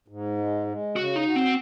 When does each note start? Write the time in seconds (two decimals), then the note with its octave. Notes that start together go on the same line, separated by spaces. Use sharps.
0.08 G#2
0.38 G#3
0.67 G#3
0.96 C#3 F#4
1.16 D#4
1.26 F#4
1.36 C4